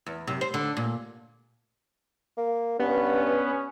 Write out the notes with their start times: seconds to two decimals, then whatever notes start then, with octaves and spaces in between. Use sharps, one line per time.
0.06 E2
0.27 F#2 C3
0.41 C5
0.54 D3
0.77 A#2
2.37 A#3
2.80 G2 B3 C#4